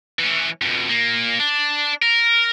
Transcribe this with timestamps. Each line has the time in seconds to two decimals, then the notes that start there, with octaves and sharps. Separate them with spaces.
0.19 E3 C#4
0.62 F2 B2
0.89 A#2 A#3
1.39 D4
2.03 A#4